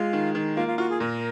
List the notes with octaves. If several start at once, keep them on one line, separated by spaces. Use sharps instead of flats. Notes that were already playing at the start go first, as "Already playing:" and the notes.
Already playing: G#3 F4
D#3
D#3
A#3 F4
F4
F4 F#4
G#4
A#2 A#4